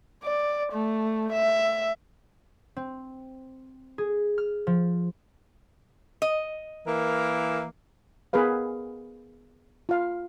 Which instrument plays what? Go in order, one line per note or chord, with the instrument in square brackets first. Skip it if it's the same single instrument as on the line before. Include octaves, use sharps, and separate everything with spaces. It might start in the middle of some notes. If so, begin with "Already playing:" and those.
[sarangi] D5
A3
E5
[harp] C4
G#4
F6
F3
[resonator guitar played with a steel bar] D#5
[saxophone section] E3 A#3 A#4
[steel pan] B3 G#4 A#4 B4 F5
F4 F5